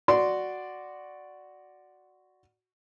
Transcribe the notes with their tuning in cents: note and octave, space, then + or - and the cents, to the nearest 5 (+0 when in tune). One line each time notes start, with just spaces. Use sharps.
F#4 +0 D5 +0 C6 -10